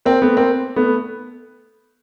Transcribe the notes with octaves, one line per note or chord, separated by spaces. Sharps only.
A#3 C4
A3 B3
A#3 C4
A3 B3